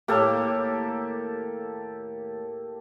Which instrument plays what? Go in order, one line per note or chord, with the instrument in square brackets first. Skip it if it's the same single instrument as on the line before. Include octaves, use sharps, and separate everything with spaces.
[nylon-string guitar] D#2 A2 C#5 [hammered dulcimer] A#3 [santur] G4 A4